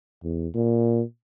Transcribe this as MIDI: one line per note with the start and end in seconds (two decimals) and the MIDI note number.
0.24 0.48 40
0.55 1.02 46